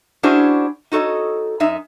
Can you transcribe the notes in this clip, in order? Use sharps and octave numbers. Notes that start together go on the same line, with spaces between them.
C#4 D4 E4 F#4 G#4 C5
D#4 F#4 A4 C#5 D#5
F#2 D#4 E5